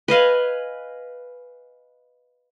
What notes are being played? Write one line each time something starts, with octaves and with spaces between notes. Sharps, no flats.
B4 D#5 F5 G#5